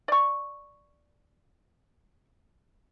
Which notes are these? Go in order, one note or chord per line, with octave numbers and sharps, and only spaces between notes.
D5 C#6